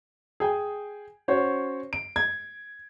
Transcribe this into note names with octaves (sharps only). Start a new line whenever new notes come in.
G#4 G5 G#5
C#4 F#4 C5 C#5
D7
G#6